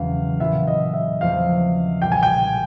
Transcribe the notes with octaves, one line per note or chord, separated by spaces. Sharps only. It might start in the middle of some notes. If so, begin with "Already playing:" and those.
Already playing: E1 E2 C#3 F#3 F5
A#2 F#3 B3 E4 E5
D#5
E5
E2 C#3 F3 A3 C4 F5
B1 A#2 G3 G5
G#5
G5